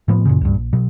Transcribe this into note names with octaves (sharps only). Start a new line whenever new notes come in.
A2 F3 B3
F#2 A#2 C#3
C#2 G2
A#1
B2 F#3